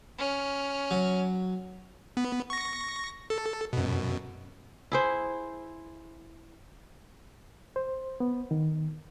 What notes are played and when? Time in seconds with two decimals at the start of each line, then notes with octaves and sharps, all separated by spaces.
0.18 C#4 F6
0.91 F#3
2.17 B3
2.50 C#6 A#6
3.30 A4
3.73 F#2 B2
4.92 E4 G#4 C5
7.76 C5
8.20 B3
8.51 D#3